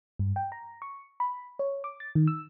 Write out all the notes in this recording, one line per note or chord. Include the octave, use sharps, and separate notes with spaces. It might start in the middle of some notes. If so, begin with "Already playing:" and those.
G2
G5
A#5
C#6
B5
C#5
D6
A6
D#3
E6